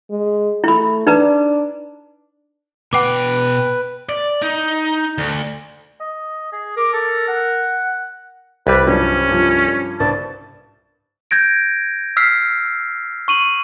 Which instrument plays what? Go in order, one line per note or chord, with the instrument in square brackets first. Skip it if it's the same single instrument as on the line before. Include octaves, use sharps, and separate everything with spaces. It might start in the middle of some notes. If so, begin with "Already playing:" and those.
[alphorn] G#3
[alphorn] A3 [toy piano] E4 B5
[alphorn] D4 [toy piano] D#4 B4 A#5
[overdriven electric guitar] B2 G5 [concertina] B4 [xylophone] F#5 D6
[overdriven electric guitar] D5
D#4
D2
[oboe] D#5
G#4
[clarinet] A#4 [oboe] D6
[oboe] A4
F#5
[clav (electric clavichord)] C2 G3 [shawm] B4
[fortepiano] G2 F3 F#3 [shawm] C#4
[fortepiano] G2 F3
[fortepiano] C2 G2 D5 [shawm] A5
[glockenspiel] G6 G#6 A#6 D7
E6 F6 B6 C7
C#6 D#7 F#7